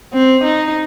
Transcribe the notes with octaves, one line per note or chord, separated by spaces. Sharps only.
C4
D#4